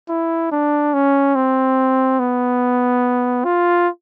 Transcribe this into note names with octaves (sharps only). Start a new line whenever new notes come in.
E4
D4
C#4
C4
B3
F4